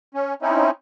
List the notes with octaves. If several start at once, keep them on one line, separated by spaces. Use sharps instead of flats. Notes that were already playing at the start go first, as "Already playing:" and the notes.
C#4
C4 C#4 D#4 E4